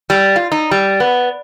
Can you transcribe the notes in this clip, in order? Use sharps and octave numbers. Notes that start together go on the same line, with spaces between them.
G3
F4
D#4
G3
B3